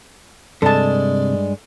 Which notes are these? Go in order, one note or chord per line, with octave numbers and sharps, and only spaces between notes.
G2 C3 G#3 A4 D5 A5